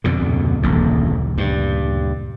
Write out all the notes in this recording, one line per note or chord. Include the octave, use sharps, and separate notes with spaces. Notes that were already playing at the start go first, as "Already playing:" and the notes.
F2 B2 D3
D2 A#2 C#3
D#1 A#1 F2
G2